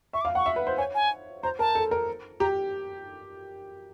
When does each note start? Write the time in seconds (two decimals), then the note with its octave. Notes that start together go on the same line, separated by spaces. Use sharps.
0.13 E5 C#6
0.21 D6
0.25 F5
0.35 F#5 C#6
0.46 E5
0.56 B4
0.67 C5
0.78 C#5 G#5
0.95 G#5
1.43 C5 A#5
1.59 A#4 A5
1.75 A4
1.91 A#4
2.40 G4 A#5